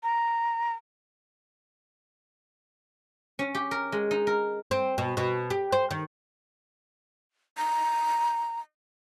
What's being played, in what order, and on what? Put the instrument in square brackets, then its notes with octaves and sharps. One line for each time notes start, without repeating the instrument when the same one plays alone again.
[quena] A#5
[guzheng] C#4
G4
A#4
G#3
D#4
A#4
[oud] C4
B2
B2
G4
C5
D#3
[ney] A#5